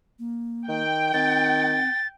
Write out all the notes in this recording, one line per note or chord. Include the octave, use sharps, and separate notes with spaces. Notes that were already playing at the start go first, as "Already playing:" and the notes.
A#3
D#3 G5
D#3 C4 A6